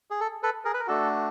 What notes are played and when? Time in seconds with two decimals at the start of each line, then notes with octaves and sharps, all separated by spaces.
0.10 G#4
0.20 A4
0.43 A4 B4
0.65 G#4 A#4
0.74 B4
0.80 A#4
0.87 A3 D4 F#4 A4